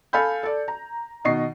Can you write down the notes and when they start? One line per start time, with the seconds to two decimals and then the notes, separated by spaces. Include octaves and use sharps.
0.13 A4 F5 G#5 B5 G6
0.43 A4 D5
0.68 A#5
1.25 B2 D#3 D#5 C#6 C7